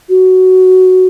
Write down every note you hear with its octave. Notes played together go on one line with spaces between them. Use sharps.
F#4